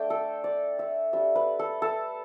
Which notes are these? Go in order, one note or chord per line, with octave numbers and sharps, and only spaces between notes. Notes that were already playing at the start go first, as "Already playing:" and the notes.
Already playing: A3 D4 G5
A4
D5
E5
G3 D4 E5
B4
A4
A4